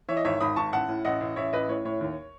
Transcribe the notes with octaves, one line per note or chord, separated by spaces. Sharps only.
E3 C#5 E5
D#5
G#1 C#5 E5
G#1 B5 D#6
G#1 A5 C#6
A1 F#5 A5
A2
A1 D#5 F#5
A1
A1 C#5 E5
A1 B4 D#5
A2 C#5
A2 C#5
D#2